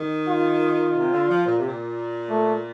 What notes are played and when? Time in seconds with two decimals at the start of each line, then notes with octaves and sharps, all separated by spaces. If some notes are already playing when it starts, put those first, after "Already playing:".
Already playing: D#3
0.28 F4
0.95 C3
1.12 D3
1.29 F3
1.45 A#2
1.57 C3
1.67 A#2
2.30 A3